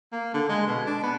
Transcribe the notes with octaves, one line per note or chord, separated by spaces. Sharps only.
A#3
D3
G#3
B2
D4
B3